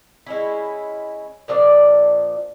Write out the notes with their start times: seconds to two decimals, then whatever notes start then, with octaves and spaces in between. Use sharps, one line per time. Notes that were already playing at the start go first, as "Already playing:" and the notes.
0.26 G#3 C#4 E4
1.48 A#2 F3 D4 D5